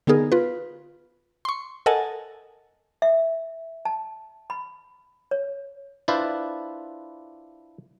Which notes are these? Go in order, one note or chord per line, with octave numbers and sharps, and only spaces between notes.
D3 B3 D#4 G#4 A#4
F4 B4
C6 C#6
A4 A#4 D#5 F#5 G#5 A5
E5
A5
B5
C#5
D4 E4 F4 B4 C5 D5